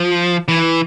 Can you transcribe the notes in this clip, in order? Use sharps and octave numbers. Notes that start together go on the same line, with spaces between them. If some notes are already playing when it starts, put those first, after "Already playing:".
Already playing: F3
E3